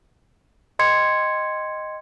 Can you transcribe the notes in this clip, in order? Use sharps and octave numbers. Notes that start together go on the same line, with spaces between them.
D#5 G5 C6 G#6 C#7